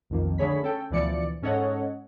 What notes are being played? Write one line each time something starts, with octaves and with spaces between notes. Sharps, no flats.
B1 F2 D#3 F3 A#3
D3 A3 G#4 C#5 B5 B6
C#4 A4 G5
D2 B2 E3 F3 D5 C#7
G#2 C#4 A4 C#5 D#5 F#5